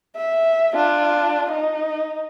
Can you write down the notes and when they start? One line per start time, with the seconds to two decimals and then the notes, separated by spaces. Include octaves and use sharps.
0.16 E5
0.75 D4 F4
1.52 D#4